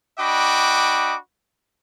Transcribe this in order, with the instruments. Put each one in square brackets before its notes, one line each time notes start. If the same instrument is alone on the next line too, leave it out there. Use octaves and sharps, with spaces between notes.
[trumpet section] D4 F#4 D#5 G5 B5 D6